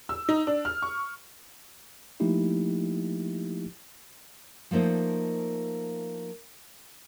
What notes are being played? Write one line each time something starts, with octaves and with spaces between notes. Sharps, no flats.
E6
D#4
D4
F6
C#6
F3 A3 A#3 D#4 E4 G4
F3 A3 A#3 D#4 C5